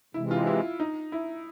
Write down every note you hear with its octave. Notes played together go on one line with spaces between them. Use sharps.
C3 E3 G#3 E4
F4
E4
D#4
E4